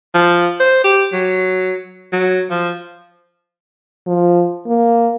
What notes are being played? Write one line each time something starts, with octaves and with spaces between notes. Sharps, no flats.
F3
C5
G4
F#3
F#3
F3
F3
A#3